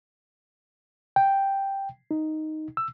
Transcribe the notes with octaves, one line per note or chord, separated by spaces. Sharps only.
G5
D#4
E6